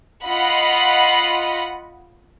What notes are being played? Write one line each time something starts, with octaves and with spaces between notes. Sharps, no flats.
F4 D#5 F#5 B5